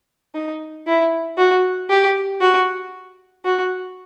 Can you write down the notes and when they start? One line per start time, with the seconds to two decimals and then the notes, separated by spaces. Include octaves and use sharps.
0.35 D#4
0.87 E4
1.37 F#4
1.90 G4
2.41 F#4
3.45 F#4